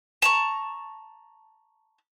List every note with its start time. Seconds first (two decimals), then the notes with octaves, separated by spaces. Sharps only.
0.22 A5 A#5 C#6